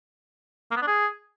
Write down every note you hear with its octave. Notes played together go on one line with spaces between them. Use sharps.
A#3
B3
D4
G#4